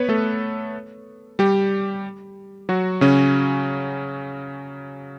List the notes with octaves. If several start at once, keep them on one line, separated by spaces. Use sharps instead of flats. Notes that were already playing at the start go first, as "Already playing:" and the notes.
Already playing: B3 B4 C#5
A3 A4
G3 G4
F#3 F#4
C#3 C#4